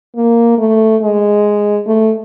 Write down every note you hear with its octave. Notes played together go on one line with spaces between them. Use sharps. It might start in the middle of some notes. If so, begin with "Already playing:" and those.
A#3
A3
G#3
A3